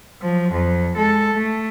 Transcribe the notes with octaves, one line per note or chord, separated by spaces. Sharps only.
F3 F#3
F2
G#3 A4
A3